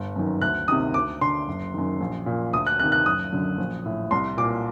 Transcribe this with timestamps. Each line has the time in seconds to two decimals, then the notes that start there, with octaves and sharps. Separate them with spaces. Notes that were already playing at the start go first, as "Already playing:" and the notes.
Already playing: G1
0.16 F#2 D#3
0.41 D2 F#6
0.68 C3 D#3 D#6
0.94 D2 D6
1.21 D3 C6
1.48 F#1
1.74 F#2 D#3
2.01 A#1
2.26 A#2
2.53 D2 D#6
2.67 F#6
2.79 C3 D#3 F#6
2.92 F#6
3.06 F#1 D#6
3.32 F#2 D3
3.58 A#1
3.86 A2
4.11 C2 C6
4.37 A#2 D6